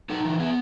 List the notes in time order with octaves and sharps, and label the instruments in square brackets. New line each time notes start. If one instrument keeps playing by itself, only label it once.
[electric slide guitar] D#4 A4
E3
B3 G#4